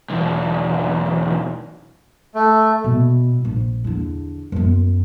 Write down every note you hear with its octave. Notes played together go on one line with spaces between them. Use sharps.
B1 E2
A3
B2
A#1
E2 D3
F#2 B3